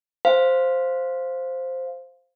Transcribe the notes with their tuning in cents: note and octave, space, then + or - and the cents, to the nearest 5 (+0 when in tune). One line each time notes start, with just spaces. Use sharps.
C5 +0 F5 +0